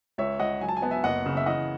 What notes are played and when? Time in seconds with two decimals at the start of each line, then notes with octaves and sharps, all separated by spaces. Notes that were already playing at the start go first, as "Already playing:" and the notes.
0.18 C#2 C#5 E5
0.39 C#2 D#5 F#5
0.61 F#3 G#5
0.69 A5
0.77 G#5
0.82 B3 A5
0.91 E5 G#5
1.04 F#1 D#5 F#5
1.26 C#3
1.37 E5
1.46 E3 D#5 F#5